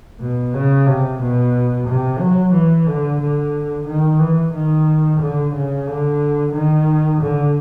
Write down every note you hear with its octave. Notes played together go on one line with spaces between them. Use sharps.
B2
C#3
C3
B2
C3
F#3
E3
D3
D3
D#3
E3
D#3
D3
C#3
D3
D#3
D3